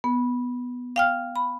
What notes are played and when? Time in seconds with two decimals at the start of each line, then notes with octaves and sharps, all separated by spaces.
0.04 B3
0.96 F5 G5 F6
1.36 B5